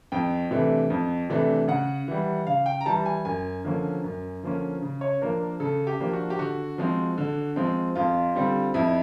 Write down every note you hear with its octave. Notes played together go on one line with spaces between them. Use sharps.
F2 G5
C3 E3 A3 D4
F2
C3 E3 A3 D4
C#3 F#5
E3 G3
C#3 F5
G5
A#5
E3 G3 A5
G#5
F#2 G#5
D3 F3 A#3 C#4
F#2
D3 F3 A#3 C#4
C#3
C#5
F3 A#3 D4 A#4
C#3 A4
G4
F3 A#3 D4
F#4
G4
D3 F#4
F3 G#3 C4
D3
F3 G#3 C4
F2 F4
D3 G3 C4
F2 E4